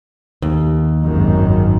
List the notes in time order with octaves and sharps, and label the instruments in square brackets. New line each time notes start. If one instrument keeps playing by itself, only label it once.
[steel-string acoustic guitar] D#2
[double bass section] G#1 F#2 D#3